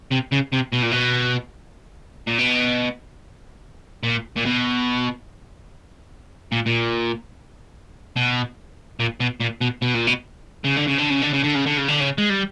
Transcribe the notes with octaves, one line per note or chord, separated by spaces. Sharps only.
C3
C#3
C3
B2
A#2
B2
A#2
B2
A#2
A#2
B2
A#2
A#2
B2
A#2
B2
A#2
B2
B2
A#2
B2
C#3
D3
C#3
D3
C#3
D3
C#3
D3
C#3
D3
C#3
D3
C#3
G#3
G3